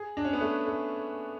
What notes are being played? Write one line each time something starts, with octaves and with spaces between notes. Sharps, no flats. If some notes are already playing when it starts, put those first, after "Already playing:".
Already playing: G#4
D4
C#4
B3
A3
A3